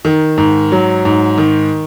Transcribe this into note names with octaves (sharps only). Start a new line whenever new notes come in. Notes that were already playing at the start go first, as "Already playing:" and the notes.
D#3
G#2
F#3
G#2
D#3